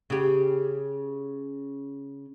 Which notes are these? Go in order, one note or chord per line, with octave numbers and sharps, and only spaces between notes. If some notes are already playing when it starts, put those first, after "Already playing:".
C#3 G4